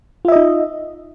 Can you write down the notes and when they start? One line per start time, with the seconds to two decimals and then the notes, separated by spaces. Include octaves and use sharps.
0.25 F4
0.28 E5
0.32 D#5
0.36 D#4